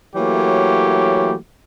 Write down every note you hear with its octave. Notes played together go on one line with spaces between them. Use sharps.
E3 F#3 A3 A#3 G4 C#5